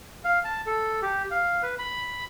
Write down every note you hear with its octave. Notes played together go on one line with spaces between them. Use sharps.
F5
A5
A4
G4
F5
B4
B5